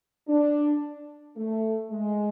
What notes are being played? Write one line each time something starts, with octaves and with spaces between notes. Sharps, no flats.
D4
A3
G#3